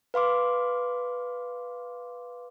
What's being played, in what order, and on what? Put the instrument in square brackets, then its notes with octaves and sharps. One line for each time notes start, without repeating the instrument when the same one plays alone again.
[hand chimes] B4 F5 C6 D6